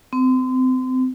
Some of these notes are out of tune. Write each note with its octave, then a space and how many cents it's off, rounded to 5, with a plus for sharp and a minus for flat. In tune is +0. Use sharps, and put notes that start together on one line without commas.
C4 -30